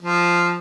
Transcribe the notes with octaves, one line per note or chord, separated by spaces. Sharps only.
F3